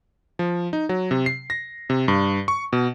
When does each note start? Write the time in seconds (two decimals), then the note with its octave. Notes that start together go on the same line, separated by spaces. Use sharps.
0.39 F3
0.73 D#4
0.89 F#3
1.11 C3
1.26 C7
1.50 A#6
1.90 C3
2.08 G2
2.48 C#6
2.73 B2